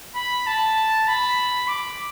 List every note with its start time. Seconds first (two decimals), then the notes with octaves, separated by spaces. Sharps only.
0.16 B5
0.47 A5
1.08 B5
1.68 D6